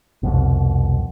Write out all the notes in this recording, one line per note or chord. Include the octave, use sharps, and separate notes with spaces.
C2 F2 B2